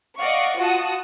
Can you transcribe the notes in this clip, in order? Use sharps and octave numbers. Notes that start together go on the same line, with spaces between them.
D5 D#5 F5 F#5 C#6
F4 F#4 F#5 A5 D#6